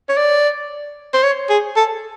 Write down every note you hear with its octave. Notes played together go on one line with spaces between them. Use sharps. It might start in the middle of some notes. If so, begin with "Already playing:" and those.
C#5
D5
C5
C#5
G#4
A4